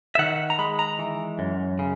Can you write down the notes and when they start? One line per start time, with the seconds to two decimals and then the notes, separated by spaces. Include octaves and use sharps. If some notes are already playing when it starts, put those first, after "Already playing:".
0.15 E5
0.19 D#3 F#5
0.50 A#5
0.59 G#3 B5
0.79 A#5
0.99 E3
1.39 F#2
1.79 C#3